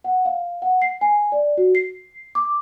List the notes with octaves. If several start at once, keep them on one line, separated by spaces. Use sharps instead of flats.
F#5
F5
F#5
C7
G#5
D5
F#4
C7
D6